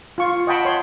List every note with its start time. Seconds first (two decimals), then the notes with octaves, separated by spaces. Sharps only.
0.18 F4 C#6
0.47 D#5 F#5 G5 A5 B5
0.65 C#5 C6